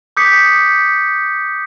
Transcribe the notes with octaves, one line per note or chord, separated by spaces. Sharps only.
D6 D#6 G6 B6 C#7